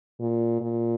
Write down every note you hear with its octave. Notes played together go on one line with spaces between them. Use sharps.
A#2
A#2